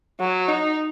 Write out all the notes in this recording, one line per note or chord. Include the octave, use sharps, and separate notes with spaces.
F#3
D#4